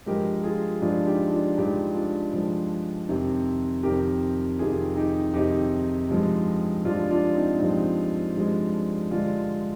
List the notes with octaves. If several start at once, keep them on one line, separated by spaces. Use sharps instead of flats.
G2 F3 G#3 G4 A#4
F4 G#4
G2 F3 G#3 D4 F4
D#4 G4
D4 F4
G2 F3 G#3 D#4 G4
D4 F4
G2 F3 G#3
F2 C3 D#3
F2 C3 D#3 G4 A#4
F2 C3 D#3 F4 G#4
D#4 G4
F2 C3 D#3 D#4 G4
G2 F3 G#3
G2 F3 G#3 D4 F4
D4 F4
C4 D#4
G2 F3 G#3 C4 D#4
G2 F3 G#3
G2 D3 G#3 D4 F4